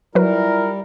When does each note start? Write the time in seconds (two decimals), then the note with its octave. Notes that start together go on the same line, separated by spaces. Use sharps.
0.15 F#3 G3 E4 F4 A#4 B4